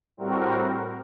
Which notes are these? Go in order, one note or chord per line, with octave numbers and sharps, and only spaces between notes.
A2 G3 C4 F#4 A#4